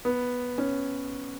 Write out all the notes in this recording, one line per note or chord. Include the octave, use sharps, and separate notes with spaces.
B3
C#4